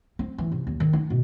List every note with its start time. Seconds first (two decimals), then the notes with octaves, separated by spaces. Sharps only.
0.19 C4
0.38 E3
0.52 C3
0.67 D#2
0.80 D#3
0.93 D#4
1.10 B2